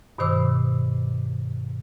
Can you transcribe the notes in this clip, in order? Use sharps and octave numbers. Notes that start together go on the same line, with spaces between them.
G2 B2 D#3 C5 D6 E6